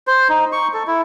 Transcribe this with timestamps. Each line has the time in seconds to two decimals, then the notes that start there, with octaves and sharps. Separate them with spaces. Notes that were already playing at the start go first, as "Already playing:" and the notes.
0.07 C5
0.29 D#4
0.52 C#6
0.74 A4
0.87 E4